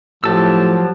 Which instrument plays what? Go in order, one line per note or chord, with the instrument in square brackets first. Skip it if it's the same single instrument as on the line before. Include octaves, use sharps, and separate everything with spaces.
[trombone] A2 [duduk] F3 [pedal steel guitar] F#3 A5 E6 [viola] G4